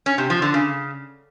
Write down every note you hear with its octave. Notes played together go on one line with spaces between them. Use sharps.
C#4
C3
F3
D3
C#3